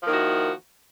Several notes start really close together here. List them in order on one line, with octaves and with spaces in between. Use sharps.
F3 A#3 D#3 F#4 E4